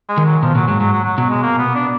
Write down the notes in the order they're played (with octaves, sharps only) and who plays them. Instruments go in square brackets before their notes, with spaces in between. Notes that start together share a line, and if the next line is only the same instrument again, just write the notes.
[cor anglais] G#3
[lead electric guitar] D#3
[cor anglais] F#3
[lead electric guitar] B2 [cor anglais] F3
[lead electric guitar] A#2 [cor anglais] F#3
[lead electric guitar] G#2 [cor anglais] F#3
[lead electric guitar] G#2 [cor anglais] F#3
[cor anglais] F#3
F#3
[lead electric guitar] B2 [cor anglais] F#3
[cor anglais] G#3
A#3
B3
D4